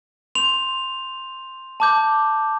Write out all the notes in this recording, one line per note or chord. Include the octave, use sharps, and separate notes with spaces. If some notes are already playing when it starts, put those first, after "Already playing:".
C6 G6 F7
A5 D6 G6